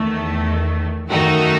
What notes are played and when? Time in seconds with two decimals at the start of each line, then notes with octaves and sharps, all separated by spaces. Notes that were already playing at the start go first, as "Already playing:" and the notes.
Already playing: E2 D#3 A3
1.09 F#2 D#3 A3 D#4 F#4